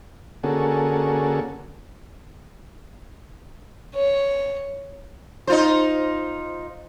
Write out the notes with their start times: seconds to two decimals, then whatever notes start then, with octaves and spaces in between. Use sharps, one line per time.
0.43 D3 A#3 C#4 F#4 G#4 A4
3.95 C#5
5.47 D#4 F4 C5